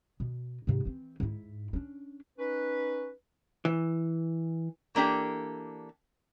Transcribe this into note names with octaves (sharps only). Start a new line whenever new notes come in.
B2
G#2 C3
E3 C4
G#2 E4
C#4 D4
C#4 D#4 B4
E3
E3 A#3 D4 G4 A4